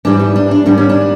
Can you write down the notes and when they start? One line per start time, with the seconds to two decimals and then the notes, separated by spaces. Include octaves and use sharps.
0.05 G#2 E3 G3 D4
0.19 D#4
0.36 D4
0.51 D4
0.65 G#2 D#3 G3 D4
0.77 C#4
0.89 D4